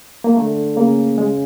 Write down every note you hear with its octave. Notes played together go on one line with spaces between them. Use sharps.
A#3
D3 A3
C#3 A#3
G#3